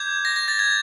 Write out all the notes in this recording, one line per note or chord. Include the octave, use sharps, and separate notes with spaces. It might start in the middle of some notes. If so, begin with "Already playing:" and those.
Already playing: D6 G6 G#6
A#6
A#6
A6
G#6